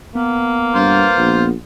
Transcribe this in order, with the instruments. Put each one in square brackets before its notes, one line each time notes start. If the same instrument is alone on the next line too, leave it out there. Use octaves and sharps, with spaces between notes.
[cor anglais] A#3 [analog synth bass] B3
[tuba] G2 [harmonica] F4 C5
[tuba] A#1